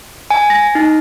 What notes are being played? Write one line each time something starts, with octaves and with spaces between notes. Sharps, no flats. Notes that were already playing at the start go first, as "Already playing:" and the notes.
G#5
A#6
D#4